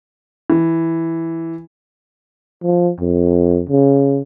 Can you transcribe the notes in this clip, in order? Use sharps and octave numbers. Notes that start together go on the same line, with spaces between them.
E3
F3
F2
C#3